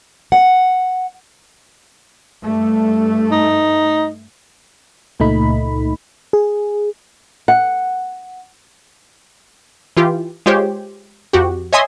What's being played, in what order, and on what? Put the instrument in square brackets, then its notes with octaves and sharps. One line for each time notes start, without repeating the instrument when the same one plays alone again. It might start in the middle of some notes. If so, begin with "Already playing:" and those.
[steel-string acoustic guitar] F#5
[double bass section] G2 A3
[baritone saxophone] D#4
[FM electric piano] C#2 A#2 A3 D#4 B5
G#4
[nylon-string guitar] F#5
[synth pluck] E3 F4 G4
G#3 F4 G4 C5 C#5
F2 F#4 G4
C#5 D#5 E5 G#5 C6 D#6